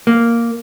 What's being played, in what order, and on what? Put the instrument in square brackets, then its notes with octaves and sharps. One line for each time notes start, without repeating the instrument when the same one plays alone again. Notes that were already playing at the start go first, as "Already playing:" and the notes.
[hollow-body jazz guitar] A#3